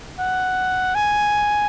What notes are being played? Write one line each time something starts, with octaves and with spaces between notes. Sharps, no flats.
F#5
G#5